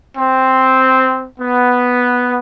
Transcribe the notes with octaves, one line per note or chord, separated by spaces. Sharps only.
C4
B3